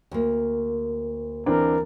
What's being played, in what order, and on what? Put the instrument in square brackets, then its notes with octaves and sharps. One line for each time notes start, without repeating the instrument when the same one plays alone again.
[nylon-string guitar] D2 A#3
[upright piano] E3 C4 D4 [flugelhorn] A#4